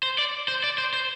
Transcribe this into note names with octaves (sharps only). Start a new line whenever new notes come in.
C5
D5
C5
D5
C5
C5